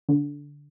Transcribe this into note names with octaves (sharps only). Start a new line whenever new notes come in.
D3